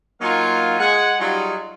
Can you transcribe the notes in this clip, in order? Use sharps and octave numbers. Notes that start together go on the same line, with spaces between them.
F#3 A#3 D#4 F4 F5 G#5
G#3 F#5 G#5
F#3 G3 D#4 F4 G#4